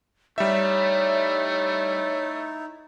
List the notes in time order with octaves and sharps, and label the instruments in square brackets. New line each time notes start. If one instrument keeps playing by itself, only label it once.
[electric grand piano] G3 E5 [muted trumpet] A3 [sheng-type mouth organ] D#4 E4 [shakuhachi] C#5